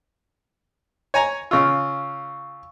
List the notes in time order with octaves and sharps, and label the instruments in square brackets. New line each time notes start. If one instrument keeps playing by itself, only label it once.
[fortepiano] C#5 G#5 A#5
[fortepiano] C#3 F4 [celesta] F5 C#6 E6